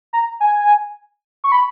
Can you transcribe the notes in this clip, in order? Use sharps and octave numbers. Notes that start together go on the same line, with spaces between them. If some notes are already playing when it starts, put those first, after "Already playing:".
A#5
G#5
C#6
B5